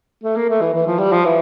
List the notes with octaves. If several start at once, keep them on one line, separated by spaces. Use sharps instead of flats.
A3
A#3
A3
E3
E3
F3
G3
F3
E3